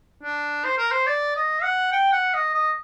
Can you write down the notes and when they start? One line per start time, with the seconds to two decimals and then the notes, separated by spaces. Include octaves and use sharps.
0.23 D4
0.65 C5
0.78 A#4
0.91 C5
1.07 D5
1.36 D#5
1.63 F#5
1.92 G5
2.12 F#5
2.34 D#5
2.54 D#5